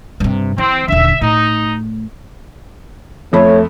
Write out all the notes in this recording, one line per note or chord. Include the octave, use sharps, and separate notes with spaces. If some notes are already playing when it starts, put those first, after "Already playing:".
G2 C3
E3 C4
D#1 D3 E5
A2 D#4
F2 A3 A4 C#5 B5